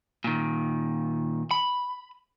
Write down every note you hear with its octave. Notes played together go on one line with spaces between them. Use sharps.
A#2 D#3
B5